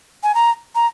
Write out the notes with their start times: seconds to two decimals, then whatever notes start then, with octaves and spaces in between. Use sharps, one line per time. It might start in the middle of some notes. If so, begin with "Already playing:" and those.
0.23 G#5
0.35 A#5
0.75 A#5